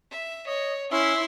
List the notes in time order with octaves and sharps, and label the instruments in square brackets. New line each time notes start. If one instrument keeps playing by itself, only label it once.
[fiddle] E5
[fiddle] C#5 [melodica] D#5
[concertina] C#4 [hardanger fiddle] E4 [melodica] E5 [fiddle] C6